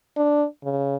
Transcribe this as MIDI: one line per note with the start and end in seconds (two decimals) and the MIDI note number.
0.16 0.45 62
0.64 0.96 49